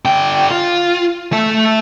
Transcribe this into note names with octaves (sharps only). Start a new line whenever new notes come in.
D3 G5
F4
A3 E5